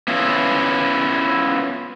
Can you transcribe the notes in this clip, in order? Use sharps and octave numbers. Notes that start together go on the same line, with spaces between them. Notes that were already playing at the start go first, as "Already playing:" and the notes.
B3 C#4 E4 F4